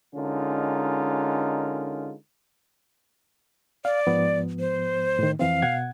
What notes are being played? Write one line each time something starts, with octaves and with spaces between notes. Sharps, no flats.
D3 G#3 C#4 D#4 F4 A#4
D5 F5
G#2 F3 B3
C5
A2 D#3
F2 E3 C4 F5
B2 F#5 G#6